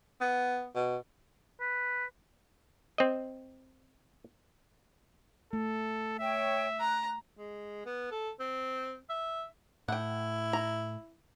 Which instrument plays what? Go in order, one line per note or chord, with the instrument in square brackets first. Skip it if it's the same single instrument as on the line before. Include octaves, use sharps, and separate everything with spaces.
[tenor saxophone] B3
B2
[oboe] B4
[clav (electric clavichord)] C4 D#5
[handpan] A3 [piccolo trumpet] A4
[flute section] C#5 G5 [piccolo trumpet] E5
[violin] A#5 [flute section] F#6
[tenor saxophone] G#3
B3
A4
C4
E5
[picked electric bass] A2 [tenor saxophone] E4 [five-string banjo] F#5 G5
[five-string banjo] A#5